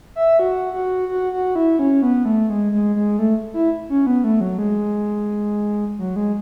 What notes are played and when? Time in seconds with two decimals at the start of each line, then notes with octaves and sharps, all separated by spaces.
0.16 E5
0.39 F#4
0.73 F#4
1.09 F#4
1.33 F#4
1.55 E4
1.79 C#4
2.02 B3
2.25 A3
2.49 G#3
2.72 G#3
2.95 G#3
3.19 A3
3.54 E4
3.89 C#4
4.07 B3
4.24 A3
4.41 F#3
4.59 G#3
5.99 F#3
6.16 G#3